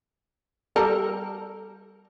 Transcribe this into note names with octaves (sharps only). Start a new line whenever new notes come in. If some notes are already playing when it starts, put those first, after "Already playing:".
G3 A4 A#4